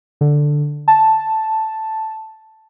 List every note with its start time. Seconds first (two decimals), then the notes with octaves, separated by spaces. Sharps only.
0.21 D3
0.88 A5